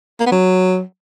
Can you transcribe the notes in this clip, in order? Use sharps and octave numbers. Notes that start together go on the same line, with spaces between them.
A#3
B3
F#3